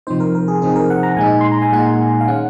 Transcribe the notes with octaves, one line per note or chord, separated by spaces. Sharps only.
C3 F3 C4 D#4 C5
A#4
A#4
G#4
C3 F3 C4 D#4 G#4
A#4
F#5
A#5
A#2 G#3 D#4 G#5
C6
A#5
G#5
A#2 G#3 D#4 F#5
F5
D#3 G#3 C#4 F#5